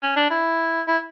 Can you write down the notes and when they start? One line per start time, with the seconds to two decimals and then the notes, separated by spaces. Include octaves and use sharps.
0.03 C#4
0.17 D4
0.30 E4
0.88 E4